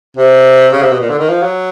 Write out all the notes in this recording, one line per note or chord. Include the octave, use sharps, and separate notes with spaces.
C3
C#3
C3
B2
A#2
D3
D#3
F3
F#3